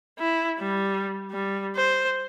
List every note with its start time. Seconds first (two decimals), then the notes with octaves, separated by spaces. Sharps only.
0.19 E4
0.59 G3
1.31 G3
1.76 C5